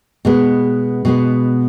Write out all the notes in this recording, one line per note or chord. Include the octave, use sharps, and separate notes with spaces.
B2 G#3 B3
B2 G#3 B3